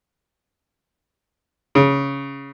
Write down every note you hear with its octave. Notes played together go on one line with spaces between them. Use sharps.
C#3